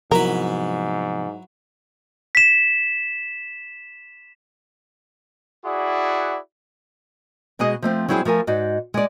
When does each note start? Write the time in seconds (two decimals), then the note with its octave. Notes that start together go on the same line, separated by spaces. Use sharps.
0.12 G#2 C3 F3 F#3 B3 E4 A#4 B4
2.35 B6 E7
5.65 E4 F#4 G#4 D5 F#5
7.59 B2 G#3 F#4 G#4 D#5
7.82 F3 A3 C4
8.09 F#3 G3 C4 E4 G4 G#4
8.25 F3 A3 A#4 G#5
8.47 G#2 D#4 F#4 D5
8.94 G#3 D5